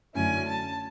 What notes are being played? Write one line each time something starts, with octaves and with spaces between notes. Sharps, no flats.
F#2 D3 A3 C#4 E4 G#5
A5